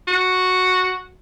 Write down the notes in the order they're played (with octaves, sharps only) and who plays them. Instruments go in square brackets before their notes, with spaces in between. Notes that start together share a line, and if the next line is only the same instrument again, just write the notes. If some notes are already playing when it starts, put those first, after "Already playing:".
[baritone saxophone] F#4